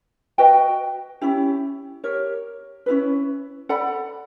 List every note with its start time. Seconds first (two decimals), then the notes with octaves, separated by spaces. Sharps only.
0.38 F#4 B4 D#5 G5
1.21 C#4 E4 G4
2.04 G4 A#4 C#5
2.86 C#4 E4 G#4 B4
3.69 A4 D5 F#5 B5